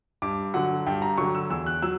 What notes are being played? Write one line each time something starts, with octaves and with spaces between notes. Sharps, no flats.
G2 D6
D3 F#3 F#5
G2 G5
A#5
D3 F#3 C#6
E6
E2 E6
F#6
F#3 E6